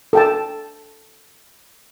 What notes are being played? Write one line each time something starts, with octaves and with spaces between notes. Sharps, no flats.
A4 G5 A5